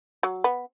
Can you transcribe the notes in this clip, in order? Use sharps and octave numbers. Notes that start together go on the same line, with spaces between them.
F#3
B3